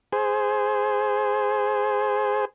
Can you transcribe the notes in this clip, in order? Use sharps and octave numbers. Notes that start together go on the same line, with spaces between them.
G#4 C5